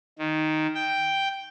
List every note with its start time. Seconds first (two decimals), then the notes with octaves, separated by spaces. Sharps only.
0.19 D#3
0.74 G5